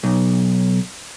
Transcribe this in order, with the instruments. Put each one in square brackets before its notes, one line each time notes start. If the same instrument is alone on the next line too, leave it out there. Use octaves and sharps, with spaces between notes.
[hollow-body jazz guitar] B1